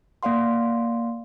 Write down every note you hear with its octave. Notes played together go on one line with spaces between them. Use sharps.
A#3 D5 F5 F#5 C6